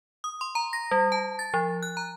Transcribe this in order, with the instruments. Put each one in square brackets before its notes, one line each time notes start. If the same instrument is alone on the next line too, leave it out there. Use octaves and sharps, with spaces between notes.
[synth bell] D#6
C6
A#5
A#6
G3
A5
A6
F3
F#6
A#5